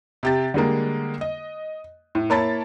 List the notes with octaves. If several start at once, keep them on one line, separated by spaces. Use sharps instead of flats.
C3 G4 A6
D3 G3 G#3 A#3
D#5
A2
A#3 E4 C#5 A5 B5 A6